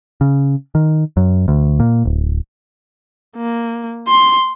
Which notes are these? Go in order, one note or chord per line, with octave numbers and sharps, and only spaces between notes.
C#3
D#3
F#2
D2
A#2
D1
A#3
C6